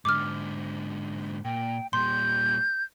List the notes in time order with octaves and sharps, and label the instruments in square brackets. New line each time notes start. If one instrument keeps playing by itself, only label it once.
[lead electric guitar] G#2 D3 [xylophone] D6 F6
[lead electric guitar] A#2 [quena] G5
[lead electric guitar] A#2 G3 [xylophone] C6 [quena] G6